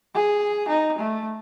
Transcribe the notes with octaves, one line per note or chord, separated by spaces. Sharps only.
G#4
D#4
A3